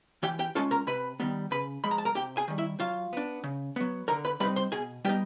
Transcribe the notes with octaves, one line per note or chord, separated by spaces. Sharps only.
E3 G4 G5
G4 G5
G#3 C#4 F4 A4 A5
A#4 A#5
C3 B4 B5
D#3 G3 B3
C#3 B4 B5
F3 G#3 B5
A#5
A5
A#4 A#5
C3 G4 G5
G#4 G#5
D#3 G3
E4 E5
F#3 F4 F5
B3 D4
C#3
F#3 B3
D3 A#4 A#5
B4 B5
G3 C4 D#4 B4 B5
C5 C6
B2 G#4 G#5
G3 B3 D#4 G4 G5